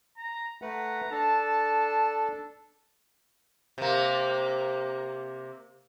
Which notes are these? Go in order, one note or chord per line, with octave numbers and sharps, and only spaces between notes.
A#5
A3 B4 F#5 A#5
D4 A4 A5
C3 A#3